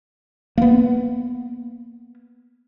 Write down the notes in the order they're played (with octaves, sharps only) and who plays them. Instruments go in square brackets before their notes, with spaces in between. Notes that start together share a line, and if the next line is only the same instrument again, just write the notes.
[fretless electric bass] A#3 B3